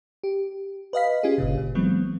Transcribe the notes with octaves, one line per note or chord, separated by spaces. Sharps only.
G4
B4 D#5 F5 B6
C#4 F4 G4 G#4
G1 A#2 C#3
A#2
E3 F#3 G#3 B3 C4